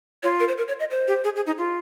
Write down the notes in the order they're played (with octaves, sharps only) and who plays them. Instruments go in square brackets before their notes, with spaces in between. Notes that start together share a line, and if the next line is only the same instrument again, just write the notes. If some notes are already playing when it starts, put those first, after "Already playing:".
[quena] F4 [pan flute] C#5
[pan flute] A#4
C5
A#4
C#5
D#5
C5
[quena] G4
G#4
G#4
D#4
F4